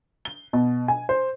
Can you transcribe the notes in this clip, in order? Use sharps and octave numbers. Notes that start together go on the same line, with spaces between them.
G7
B2
G#5
C5